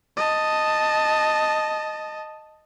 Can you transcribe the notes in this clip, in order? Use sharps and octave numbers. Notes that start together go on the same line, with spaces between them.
D#5 A5